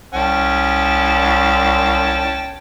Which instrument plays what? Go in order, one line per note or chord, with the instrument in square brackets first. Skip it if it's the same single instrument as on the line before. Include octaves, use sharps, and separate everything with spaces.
[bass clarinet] C2 [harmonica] C#4 G5 A5